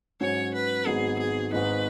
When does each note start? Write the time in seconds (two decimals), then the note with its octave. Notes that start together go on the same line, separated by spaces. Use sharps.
0.21 G#2 F#3 C#4 C#5
0.54 B4
0.86 G#1 G#2 F#3 B3 D#4 G#4
1.19 G#4
1.52 G#1 G#2 G#3 D#4 B4